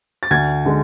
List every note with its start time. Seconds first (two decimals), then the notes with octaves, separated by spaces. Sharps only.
0.23 A6
0.31 D2 G#6
0.65 D3 G#3